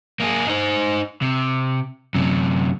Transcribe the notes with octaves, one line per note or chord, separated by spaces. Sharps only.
A#3 G#4
D#4 C5
C3
F#2 C3